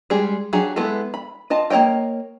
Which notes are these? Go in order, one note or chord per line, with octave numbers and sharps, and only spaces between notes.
G3 G#3 G#4
F#3 D4 G4 G#4
G#3 B3 E4 A4
B5
F4 D#5 A5
A#3 D#4 C#5 D#5 G5